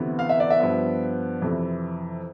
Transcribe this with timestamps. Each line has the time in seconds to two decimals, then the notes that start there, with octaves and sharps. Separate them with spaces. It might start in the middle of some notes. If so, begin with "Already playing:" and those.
Already playing: D2 C3 E3 B3
0.19 F5
0.29 E5
0.40 D5
0.50 E5
0.60 G2 F3 B3
1.42 F2 C3 E3